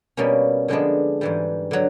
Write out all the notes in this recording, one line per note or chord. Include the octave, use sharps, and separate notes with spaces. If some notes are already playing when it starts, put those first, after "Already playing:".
B2 G3 A#3 C#4
D3 F3 G#3 B3 D4
G#2 E3 G3
D3 F#3